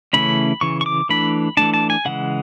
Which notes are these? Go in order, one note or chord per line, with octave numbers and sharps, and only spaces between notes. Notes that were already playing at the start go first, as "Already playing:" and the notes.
C#3 E3 A3 C#4 E4 B5
C#3 E3 C#6
C#6
D6
E3 A3 D4 B5
E3 A3 D4 A5
A5
G#5
C#3 E3 G#3 F#5